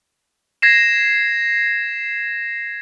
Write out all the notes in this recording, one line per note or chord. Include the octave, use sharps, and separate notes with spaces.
G#6 A#6 C7 E7